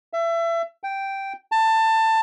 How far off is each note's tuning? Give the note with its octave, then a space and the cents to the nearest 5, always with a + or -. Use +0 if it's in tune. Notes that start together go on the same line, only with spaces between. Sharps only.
E5 +30
G5 -5
A5 +20